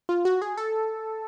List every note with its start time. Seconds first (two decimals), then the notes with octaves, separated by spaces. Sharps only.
0.09 F4
0.25 F#4
0.42 G#4
0.57 A4